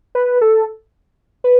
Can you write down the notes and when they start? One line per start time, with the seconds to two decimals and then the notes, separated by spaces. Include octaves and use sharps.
0.15 B4
0.41 A4
1.44 B4